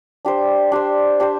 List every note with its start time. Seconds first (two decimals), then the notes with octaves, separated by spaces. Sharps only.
0.25 D4 G4 C5
0.72 D4 G4 C5
1.20 D4 G4 C5